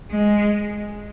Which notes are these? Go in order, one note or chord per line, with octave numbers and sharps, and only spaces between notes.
G#3